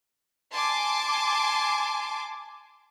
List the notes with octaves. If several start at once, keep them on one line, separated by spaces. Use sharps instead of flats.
G#5 A5 C6 D6